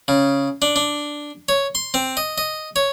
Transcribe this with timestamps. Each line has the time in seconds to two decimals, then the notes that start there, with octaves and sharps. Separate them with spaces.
0.08 C#3
0.62 D4
0.76 D4
1.49 C#5
1.75 C6
1.94 C4
2.17 D#5
2.38 D#5
2.76 C#5